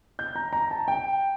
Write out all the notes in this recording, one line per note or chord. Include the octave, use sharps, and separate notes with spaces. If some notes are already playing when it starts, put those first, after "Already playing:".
G6
A#5
A#5
A5
G5